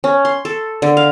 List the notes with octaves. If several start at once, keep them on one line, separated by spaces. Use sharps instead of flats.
C#4
C6
A4
D3
F5